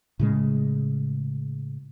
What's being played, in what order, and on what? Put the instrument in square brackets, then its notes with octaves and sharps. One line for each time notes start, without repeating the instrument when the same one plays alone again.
[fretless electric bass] A2 C#3 G#3